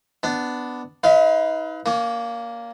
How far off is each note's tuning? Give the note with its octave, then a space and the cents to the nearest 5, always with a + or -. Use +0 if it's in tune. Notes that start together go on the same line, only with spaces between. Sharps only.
B3 +10 D4 +0
D#4 +40 B4 +20 F5 +0
A#3 +0 C#4 +40